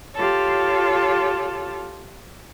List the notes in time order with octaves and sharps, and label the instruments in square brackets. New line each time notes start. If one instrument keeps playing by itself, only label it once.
[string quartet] F4 G4 A4 C#5